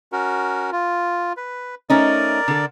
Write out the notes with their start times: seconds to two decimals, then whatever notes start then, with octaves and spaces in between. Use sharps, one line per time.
0.12 C#4 F#4 A#4
0.72 F4
1.37 B4
1.90 A3 C#4 D#4 A#4 D5
2.48 D3 A4